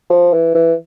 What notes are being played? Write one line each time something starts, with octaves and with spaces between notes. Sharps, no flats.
F3
E3
E3